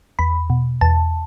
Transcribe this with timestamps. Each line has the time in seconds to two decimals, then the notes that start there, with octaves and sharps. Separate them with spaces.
0.19 E2 B5
0.50 B2
0.81 E2 A5